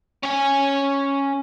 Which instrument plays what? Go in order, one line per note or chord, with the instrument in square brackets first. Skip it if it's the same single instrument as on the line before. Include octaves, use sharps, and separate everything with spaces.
[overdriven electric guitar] C#4 G#5